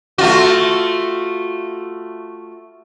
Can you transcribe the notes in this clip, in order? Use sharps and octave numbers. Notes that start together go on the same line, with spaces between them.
A3 F4 F#4